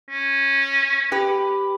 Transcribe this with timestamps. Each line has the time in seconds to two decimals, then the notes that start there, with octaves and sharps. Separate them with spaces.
0.10 C#4
1.12 G4 B4